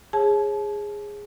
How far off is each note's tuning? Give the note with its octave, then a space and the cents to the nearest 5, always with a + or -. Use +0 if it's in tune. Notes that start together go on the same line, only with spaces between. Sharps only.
G#4 -10 C#5 -30 A5 -35